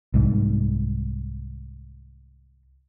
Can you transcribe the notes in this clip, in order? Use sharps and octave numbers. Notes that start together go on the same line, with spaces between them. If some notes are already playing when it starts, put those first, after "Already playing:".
C2 G#2